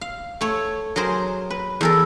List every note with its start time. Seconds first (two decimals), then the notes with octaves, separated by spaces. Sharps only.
0.01 F5
0.41 A3 C#5
0.96 F#3 G#4 A#4 C5
1.50 B4
1.81 E2 A4 A#4